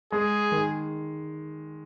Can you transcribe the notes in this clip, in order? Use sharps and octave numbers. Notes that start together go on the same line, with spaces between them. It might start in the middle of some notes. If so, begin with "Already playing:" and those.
G#3 G#4
D#3